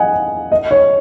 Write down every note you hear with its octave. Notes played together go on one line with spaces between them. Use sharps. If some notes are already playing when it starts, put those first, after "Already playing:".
Already playing: D#5 F#5 G#5
D#5
C#5